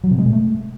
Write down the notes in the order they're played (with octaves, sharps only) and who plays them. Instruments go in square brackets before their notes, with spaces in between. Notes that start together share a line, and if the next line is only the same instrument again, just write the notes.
[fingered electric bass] F#3
C3
G#3
B2
A3